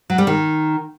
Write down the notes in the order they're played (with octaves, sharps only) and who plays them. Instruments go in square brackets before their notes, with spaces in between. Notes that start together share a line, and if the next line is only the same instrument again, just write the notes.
[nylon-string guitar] F#3
G3
D#3